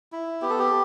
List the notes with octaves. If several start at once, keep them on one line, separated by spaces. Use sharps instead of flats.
E4
B3 G4
A4
G4